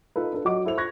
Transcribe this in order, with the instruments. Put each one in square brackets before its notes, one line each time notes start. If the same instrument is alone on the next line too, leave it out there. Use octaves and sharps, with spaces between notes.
[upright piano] D#4 F4 A4 B4
D4 A4 B4
F#3 D#5 F#5 D6
E4 A4 C5 F7
C#6 F#6 G#6 A#6